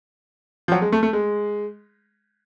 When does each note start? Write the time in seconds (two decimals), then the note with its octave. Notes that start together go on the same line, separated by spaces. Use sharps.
0.68 F3
0.72 F#3
0.82 G#3
0.92 A3
1.03 A3
1.13 G#3